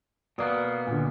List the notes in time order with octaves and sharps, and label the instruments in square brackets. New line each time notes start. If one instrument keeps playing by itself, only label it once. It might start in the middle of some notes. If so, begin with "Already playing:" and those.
[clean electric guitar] B2 A#3 B3 [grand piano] D5 D#6
[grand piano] A#2 D3